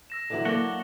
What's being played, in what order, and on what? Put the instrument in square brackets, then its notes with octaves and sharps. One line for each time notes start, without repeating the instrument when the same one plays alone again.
[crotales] E6 A#6 E7
[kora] D3 E3 F#3
[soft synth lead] A#3 [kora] D4 A4 C#5 [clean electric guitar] F#4 [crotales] D6 G7